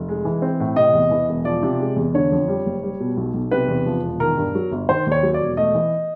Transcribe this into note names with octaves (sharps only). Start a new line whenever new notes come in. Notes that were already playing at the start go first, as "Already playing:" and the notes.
Already playing: F1
G#3
E3
C4
A2
C3 D#5
E2
E3
E1
F3 D5
C3
G#3
E2
D3 C#5
F2
G3
F#1
G3
B2
B1
B1
C3 B4
E2
F3
E1
D#3 A#4
G2
F#3
G1
D#3 C5
D#2 C#5
F#3
D5
E1
A3 D#5
E3